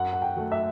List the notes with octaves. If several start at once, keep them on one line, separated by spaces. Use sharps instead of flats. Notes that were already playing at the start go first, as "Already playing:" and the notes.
Already playing: F#2 F#5
F#5
G5
F#3 A3
E5